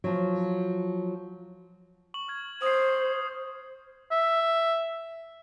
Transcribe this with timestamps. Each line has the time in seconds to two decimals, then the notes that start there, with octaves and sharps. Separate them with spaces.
0.04 F3 F#3
2.14 C#6 F#7
2.28 F6 G#6
2.62 C5 D#6 C7
4.12 E5